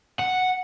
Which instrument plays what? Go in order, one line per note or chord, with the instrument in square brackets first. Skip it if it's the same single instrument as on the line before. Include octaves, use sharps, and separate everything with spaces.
[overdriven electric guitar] F#5